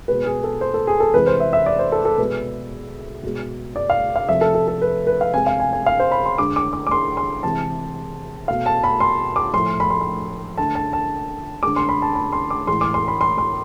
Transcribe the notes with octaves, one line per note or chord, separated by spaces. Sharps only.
B2 G#3 B4
G#4
A4
C5
A4
G#4
A4
C3 E3 G#3 B4
C5
E5
E5
D5
C5
A4
A4
B2 G#3 B4
B2 G#3
D5
F5
F5
C3 F3 A3 E5
A4
A4
A4
B4
B4
F5
C3 G#3 G#5
F5
G#5
G#5
F5
C5
B5
C6
D3 G#3 D6
D6
D6
D6
C6
C6
C3 E3 G#3 A5
B2 A3 F5
A5
B5
C6
D6
A2 F3 A3 C6
B5
C6
B5
D3 A3 A5
A5
A5
D3 G#3 D6
C6
B5
A5
B5
C6
D6
A2 E3 G#3 C6
D6
C6
B5
C6
C6